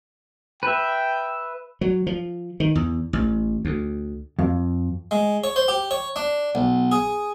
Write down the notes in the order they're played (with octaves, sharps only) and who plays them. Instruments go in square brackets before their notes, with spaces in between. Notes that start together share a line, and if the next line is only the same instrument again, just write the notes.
[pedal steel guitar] B4 E5 [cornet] G5
[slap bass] F#3
F3
D#3
E2
A1
D2
[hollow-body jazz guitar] F2
[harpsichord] G#3
C#5
C5
G4
C#5
D4
B1
G#4